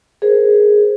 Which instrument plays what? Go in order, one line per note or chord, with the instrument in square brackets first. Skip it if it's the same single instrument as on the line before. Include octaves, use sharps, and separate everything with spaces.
[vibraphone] G#4 A#4 C5